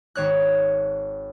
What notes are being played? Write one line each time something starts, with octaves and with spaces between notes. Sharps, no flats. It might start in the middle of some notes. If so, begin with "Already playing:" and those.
G#1 C#5 F#6